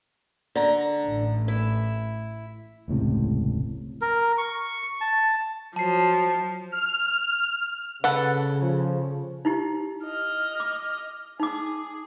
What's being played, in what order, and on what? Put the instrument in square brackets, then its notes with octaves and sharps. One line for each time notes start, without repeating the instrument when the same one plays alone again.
[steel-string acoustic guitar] D3 A#5
[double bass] A1 A2
[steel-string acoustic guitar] E4
[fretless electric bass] E1 C#2 A2 C3
[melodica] A#4
C#6
A5
[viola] F3 [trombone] F#3 [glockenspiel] A5 C7
[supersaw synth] F6
[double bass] C#3 [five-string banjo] A4 B4 F#5
[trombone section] F3
[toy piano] D#4 E4 G4
[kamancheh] D#5 F6
[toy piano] D6
[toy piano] D#4 D6 [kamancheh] G#4